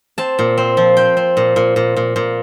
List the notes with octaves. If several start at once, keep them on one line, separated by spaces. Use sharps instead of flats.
C4 A5
A#2
C4
F3
C4 G5
C4
A#2
A#2
A#2
A#2
A#2